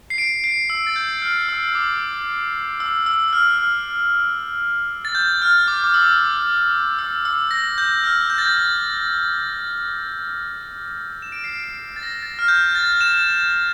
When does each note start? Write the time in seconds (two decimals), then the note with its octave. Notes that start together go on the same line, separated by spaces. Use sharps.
0.10 C7
0.18 D7
0.44 C7
0.70 E6
0.87 A6
0.96 G6
1.22 F6
1.49 E6
1.68 E6
1.75 D6
2.80 E6
3.06 E6
3.33 F6
3.49 E6
3.58 F6
5.05 A6
5.15 G6
5.42 F6
5.68 D6
5.84 D6
5.94 E6
6.72 F6
6.99 E6
7.25 E6
7.51 A#6
7.78 G6
8.04 F6
8.30 G6
8.38 A6
8.46 G6
11.22 E7
11.32 D7
11.44 C7
11.64 D7
11.96 A6
12.03 A#6
12.23 A6
12.39 F6
12.48 G6
12.75 A6
13.01 E7